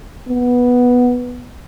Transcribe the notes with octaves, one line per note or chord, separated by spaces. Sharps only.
B3